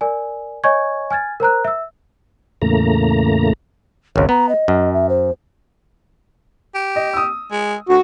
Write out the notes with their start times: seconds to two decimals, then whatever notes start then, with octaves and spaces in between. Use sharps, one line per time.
0.01 A#4 D5 G#5
0.64 C#5 D#5 G#5 C#6 G#6
1.11 G#5 F6 G#6 A6
1.40 A#4 C5 A#5 F#6
1.65 E5 E6
2.62 E2 A2 C#3 A3 A#3 A#5
4.16 G#1 C#2 C#5
4.29 B3 A#5
4.49 D#5
4.68 F#2
4.93 E5
5.09 C5
6.75 G4
6.96 D#5
7.13 D#6 E6
7.52 G#3
7.89 D2 F#4